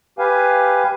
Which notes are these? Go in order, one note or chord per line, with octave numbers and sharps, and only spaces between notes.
G4 B4 F5 G#5